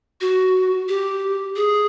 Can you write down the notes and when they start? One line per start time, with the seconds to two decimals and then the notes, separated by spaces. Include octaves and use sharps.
0.21 F#4
0.89 G4
1.56 G#4